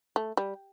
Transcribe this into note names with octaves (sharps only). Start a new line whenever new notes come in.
A3
G3